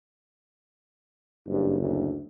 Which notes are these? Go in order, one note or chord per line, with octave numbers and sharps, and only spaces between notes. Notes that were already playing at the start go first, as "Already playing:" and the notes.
F#1 G2
D2